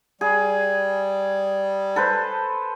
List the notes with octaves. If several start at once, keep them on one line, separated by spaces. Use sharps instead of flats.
G3 G#4
A4 B4 C5